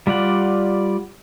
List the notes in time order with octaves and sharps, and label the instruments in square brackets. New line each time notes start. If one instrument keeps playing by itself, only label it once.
[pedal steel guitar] G3 F4 D5 F#5